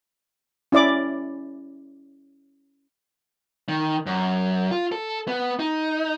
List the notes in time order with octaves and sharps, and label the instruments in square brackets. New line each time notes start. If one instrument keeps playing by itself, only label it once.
[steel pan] C#4 E4 D5 D6
[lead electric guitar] D#3
F#2
F4
A4
B3
D#4